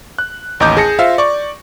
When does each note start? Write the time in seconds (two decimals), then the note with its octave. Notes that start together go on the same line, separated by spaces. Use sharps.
0.19 F#6
0.60 A1 D#2 D#5 A#5 D6 G6
0.77 G#4 A5 A#6 C#7
0.99 F4 C5 E5 F5
1.18 D5 C#6